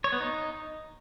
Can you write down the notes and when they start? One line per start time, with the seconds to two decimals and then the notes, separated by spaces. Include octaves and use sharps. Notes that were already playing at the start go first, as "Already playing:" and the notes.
0.04 C#5
0.12 B3
0.20 D#4